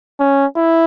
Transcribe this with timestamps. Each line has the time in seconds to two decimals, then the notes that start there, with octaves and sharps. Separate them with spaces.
0.20 C#4
0.57 E4